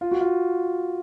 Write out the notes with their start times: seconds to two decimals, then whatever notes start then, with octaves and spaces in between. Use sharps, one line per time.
0.01 F4
0.11 F#4
0.21 F4